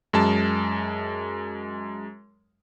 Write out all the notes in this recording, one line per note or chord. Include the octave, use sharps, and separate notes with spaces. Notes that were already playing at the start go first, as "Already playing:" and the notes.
F#2 G#3 A5